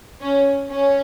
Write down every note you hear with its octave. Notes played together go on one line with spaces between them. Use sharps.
C#4
C#4